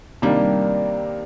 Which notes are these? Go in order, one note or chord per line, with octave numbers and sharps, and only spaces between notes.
C3 D#3 G3 A#3 D4